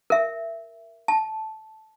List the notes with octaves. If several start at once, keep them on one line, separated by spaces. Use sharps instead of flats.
A#4 E5
A5